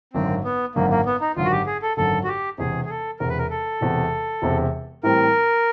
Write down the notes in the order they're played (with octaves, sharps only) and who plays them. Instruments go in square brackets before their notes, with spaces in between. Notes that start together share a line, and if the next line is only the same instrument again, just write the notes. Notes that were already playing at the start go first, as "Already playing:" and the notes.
[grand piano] G#1 F#2 D3 [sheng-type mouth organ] C4
[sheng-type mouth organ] B3
[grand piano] G#1 F#2 D3 [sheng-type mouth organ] A#3
[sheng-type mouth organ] A#3
B3
D#4
[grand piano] G#1 F#2 D3 [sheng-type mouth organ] F4
[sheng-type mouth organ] F#4
G4
G#4
A4
[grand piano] G#1 F#2 D3 [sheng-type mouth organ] A4
[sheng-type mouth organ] F#4
G4
[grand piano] E1 E2 C3 [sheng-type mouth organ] G#4
[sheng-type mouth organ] G#4
A4
[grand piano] E1 E2 C3 [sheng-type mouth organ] A#4
[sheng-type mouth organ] B4
A#4
A4
[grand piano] E1 E2 C3
E1 E2 C3
[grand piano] A2 E3 G3 C4 [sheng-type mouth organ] A#4